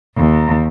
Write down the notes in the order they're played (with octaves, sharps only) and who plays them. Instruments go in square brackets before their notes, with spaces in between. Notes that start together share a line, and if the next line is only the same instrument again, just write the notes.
[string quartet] D#2